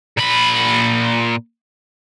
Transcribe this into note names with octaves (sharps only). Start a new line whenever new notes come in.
A#2 B5